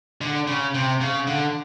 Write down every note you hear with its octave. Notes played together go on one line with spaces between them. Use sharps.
D3
C#3
C3
C#3
D3